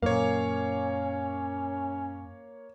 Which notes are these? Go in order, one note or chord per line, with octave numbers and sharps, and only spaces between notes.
F#2 A#2 A#3 C#4 C#5 F5